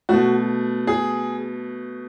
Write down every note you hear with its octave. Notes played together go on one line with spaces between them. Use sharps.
B2 A3 F#4
G#4